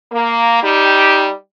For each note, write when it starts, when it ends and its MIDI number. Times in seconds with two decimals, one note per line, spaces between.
0.12 0.59 58
0.62 1.31 55
0.62 1.31 63
0.62 1.31 67